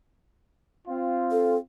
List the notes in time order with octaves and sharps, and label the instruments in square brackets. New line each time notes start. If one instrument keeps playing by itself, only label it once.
[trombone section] C4 F4
[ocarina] A4